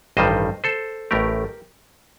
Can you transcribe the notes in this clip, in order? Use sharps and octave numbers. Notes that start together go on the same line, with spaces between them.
A1 G2 D#3 G3 C5 D#5
A4 C5
A1 A2 A3 G4 A#4